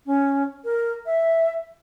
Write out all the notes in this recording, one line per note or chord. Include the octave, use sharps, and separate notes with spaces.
C#4
A#4
E5